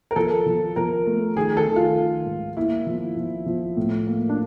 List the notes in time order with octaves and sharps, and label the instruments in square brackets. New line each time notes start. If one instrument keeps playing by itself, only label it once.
[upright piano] A#4
[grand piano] F3 [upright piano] A4
[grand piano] F3
[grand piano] F3 [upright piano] A#4
[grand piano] A3
[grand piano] D#3 [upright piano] G#4
[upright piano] A4
[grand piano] D#3
[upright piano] F4
[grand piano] D#3
G#2
[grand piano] A#3 [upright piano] E4
[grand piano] F3
F3
F3
A2
A#3
[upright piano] D4